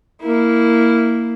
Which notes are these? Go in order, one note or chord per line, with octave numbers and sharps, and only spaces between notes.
A#3 E4